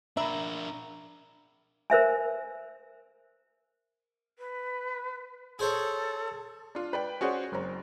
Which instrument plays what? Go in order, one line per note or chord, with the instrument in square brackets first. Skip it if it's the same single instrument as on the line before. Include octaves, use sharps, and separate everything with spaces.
[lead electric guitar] D4 A#4 [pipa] E5 [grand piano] A#5 B5
[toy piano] A#4 C5 E5 G#5
[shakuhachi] B4
[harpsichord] G#4 C5 C#5 [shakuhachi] A4
[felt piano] D4 F4
B4 D5 G5
C#4 F#4 G#4 C5 D5
F#1 C4 A#5